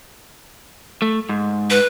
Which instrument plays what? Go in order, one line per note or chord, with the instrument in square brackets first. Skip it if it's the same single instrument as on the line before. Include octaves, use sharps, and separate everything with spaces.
[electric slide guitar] A3
G#2
[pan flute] B4